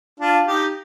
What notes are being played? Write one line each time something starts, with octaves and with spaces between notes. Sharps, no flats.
D4 F4
D#4 G4